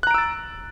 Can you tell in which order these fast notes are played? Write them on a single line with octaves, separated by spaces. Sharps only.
F#6 A#5 D7 E6 A6